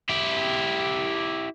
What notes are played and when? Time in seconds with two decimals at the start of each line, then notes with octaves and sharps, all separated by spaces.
0.09 E4 G4